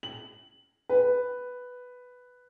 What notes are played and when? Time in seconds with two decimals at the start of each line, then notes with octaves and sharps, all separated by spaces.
0.03 F#7
0.89 B4